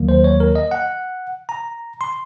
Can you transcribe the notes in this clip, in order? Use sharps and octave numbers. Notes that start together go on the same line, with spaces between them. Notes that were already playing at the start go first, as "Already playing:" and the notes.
Already playing: D#2 D#3 F#3 A#3
C5
C#5
A#4
D#5
F#5
A#5
C6